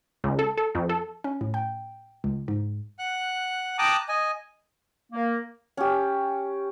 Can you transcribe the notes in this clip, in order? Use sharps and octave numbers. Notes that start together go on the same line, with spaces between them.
C#2
A4
A4
F2
A4
C#4
A2
G5
C#2
G#2
F#5 F#6
G5 A5 A#5 D6 D#6 F#6
D#5 G#5
A#3
C#4 G4